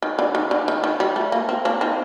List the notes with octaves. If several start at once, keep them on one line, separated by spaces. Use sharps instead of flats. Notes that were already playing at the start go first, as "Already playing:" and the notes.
D#3
D3
D#3
D3
D#3
D#3
G3
A3
A#3
C4
A#3 D4
C4 D#4